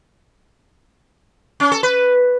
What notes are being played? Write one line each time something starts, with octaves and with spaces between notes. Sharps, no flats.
C#4
A4
B4